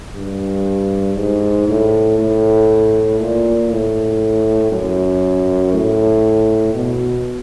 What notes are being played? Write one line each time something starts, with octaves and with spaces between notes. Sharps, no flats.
G2
G#2
A2
A2
A#2
A2
F#2
A2
B2